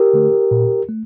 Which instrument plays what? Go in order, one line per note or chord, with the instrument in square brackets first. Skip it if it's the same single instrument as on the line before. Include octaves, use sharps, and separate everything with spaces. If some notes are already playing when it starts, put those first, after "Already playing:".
Already playing: [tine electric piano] G4 A#4
D3 A3
A#2
A3